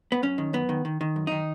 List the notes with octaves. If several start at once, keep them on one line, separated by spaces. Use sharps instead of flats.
B3
F#2 C#4
D#3
F#2 B3
D#3
D#3
D#3
F#2
D#3 D#4